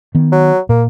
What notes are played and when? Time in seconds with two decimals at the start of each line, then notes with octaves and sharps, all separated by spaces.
0.15 D#3 B3
0.32 F#3
0.69 A#2 A#3